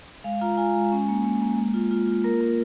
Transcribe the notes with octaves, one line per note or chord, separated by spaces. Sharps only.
G#3 F5
F4 A#5
F4 G#5
G#3
C#4
A#3
A#3
A#3
G#3
F4
F4
F4
A#3 A#4
A#3